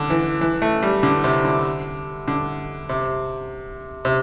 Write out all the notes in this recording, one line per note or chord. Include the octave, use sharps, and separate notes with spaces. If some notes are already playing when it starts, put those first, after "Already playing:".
Already playing: D3
E3
E3
A3
G3
D3
C3
D3
D3
C3
C3